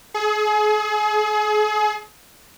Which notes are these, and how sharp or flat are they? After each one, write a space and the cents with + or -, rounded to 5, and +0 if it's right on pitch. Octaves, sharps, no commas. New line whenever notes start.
G#4 +35